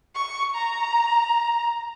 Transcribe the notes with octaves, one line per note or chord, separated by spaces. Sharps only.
C#6
A#5